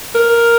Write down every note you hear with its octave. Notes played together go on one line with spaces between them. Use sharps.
A#4